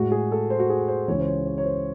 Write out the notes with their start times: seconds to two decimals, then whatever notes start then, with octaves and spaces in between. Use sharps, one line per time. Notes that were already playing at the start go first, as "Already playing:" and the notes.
Already playing: A2 G#3 F#4
0.12 G#4
0.32 A4
0.50 C5
0.59 F#4
0.70 G#4
0.88 C5
1.08 C#2 C#3 E3 G#3 C#5
1.19 C5
1.27 C#5
1.46 C#5
1.58 C#5
1.64 C5